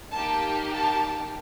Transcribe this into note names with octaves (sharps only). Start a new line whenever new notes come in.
A#3 D#4 G4 A5
A5